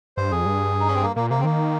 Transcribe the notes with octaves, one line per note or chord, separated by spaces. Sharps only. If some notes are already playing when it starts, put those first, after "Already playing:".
G2 C5
F2 G#4
G2
D#4
C#4
C4
A#3
A#2 A#3
C3 A#3
C#3 C4
D#3 A#3